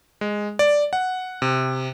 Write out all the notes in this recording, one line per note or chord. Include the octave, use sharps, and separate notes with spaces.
G#3
D5
F#5
C3